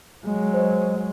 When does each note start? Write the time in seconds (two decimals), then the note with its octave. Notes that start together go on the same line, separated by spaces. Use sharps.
0.24 F#3 G#3
0.54 C5 D#5